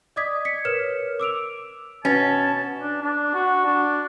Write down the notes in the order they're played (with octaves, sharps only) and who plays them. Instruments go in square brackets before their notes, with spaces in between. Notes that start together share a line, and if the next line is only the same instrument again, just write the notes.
[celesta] D5 D#5 D6 D#6 G#6 B6
B6 C#7
A#4 B4 C#5 F6 E7
D6 E6 D7 F7
[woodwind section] B2 A5 [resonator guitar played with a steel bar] C#4
[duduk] D4
D4
F#4
D4